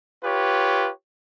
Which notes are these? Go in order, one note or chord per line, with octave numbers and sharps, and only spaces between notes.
F4 G4 B4 C#5